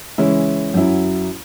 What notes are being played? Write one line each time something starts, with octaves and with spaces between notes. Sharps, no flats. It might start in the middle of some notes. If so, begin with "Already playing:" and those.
C#3 E3 G#3 C#4 E4
F#2 F#3 E4